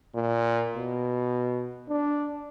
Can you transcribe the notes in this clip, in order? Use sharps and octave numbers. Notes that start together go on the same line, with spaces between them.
A#2
B2
D4